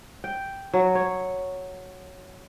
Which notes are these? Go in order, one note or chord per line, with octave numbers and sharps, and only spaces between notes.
G5
F#3
C#5